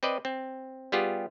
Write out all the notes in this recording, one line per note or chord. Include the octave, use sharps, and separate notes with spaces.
C4 B4 D5 D#5
C4
G3 B3 F4 G4 G#4